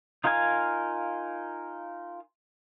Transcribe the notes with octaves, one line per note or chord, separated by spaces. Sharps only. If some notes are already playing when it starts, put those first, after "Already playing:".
D#4 F4 A#4 F5 G#5